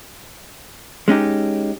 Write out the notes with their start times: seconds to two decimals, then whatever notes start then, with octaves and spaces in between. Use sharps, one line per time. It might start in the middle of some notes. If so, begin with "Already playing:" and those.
1.08 G#3 C#4 D#4 G4